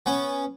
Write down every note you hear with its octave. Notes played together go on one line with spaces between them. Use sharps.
B3 C#4